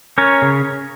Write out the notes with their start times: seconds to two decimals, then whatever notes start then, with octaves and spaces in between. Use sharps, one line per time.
0.18 C#4 A#4 C#5
0.42 C#3